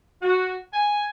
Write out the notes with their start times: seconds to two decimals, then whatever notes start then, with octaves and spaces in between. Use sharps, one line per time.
0.22 F#4
0.74 G#5